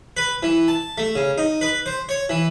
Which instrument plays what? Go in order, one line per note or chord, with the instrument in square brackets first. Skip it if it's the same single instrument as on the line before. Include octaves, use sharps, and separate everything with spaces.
[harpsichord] B4
E3
A5
A3
C#3
D#4
B4
C5
C#5
E3